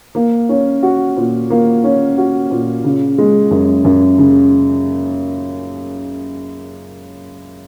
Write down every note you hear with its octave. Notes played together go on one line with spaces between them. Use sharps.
A#3
C#4
F#4
A#2
A#3
C#4
F#4
A#2
C#3
G#3
F#2
F#2
C#3